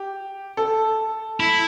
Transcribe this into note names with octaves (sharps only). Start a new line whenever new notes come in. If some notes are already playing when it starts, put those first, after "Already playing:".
Already playing: G4
A4
E4